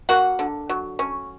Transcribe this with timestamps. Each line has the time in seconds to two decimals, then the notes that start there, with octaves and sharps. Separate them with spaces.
0.09 A#3 F#4 F#5
0.39 D3
0.69 F#3
0.99 C#4